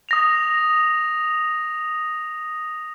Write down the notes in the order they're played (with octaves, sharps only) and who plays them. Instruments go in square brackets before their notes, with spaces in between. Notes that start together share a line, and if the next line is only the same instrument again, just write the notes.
[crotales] D#6 A#6 F7